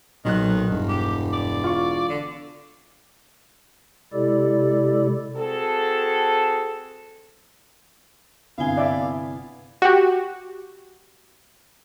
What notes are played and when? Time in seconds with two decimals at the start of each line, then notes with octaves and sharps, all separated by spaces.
0.25 B1 A#2 D#3 F#3 F#6
0.70 E1 G2
0.89 G4
1.33 D5
1.64 F4 F5 C#6
2.09 D3
4.13 C3 G#3 E4 G4 A4 D5
5.36 C4 F#4 G#4 A4
8.58 G1 C3 B3 E4 F5 G#5 G7
8.77 D5 E5
9.82 F#4 G4